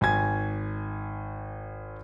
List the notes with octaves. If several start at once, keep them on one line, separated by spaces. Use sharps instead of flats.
G#1 G#5 G#6